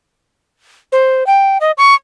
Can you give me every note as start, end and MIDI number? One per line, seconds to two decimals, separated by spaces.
0.92 1.26 72
1.27 1.58 79
1.61 1.72 75
1.78 1.94 85